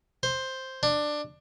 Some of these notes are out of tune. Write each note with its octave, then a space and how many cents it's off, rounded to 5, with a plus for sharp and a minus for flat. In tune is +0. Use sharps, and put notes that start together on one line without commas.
C5 +5
D4 +15